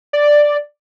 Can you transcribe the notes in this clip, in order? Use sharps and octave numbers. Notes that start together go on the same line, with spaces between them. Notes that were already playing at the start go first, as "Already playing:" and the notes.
D5